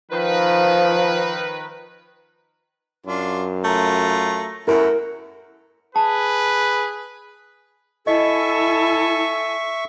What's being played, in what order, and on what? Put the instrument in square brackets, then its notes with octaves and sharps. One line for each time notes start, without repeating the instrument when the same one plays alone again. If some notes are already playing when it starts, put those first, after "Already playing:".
[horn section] D#3 B4 [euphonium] F3
[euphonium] F#2 [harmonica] D4 F4
[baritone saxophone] A3 [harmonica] F4 A#5
[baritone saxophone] F#2 [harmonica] A3 F#4 [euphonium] E4 [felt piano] A#4
[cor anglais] G#4 [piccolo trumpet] B4 [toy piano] A5
[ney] E4 [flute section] A4 G#5 E6 [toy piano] D#5 [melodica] E5 C#6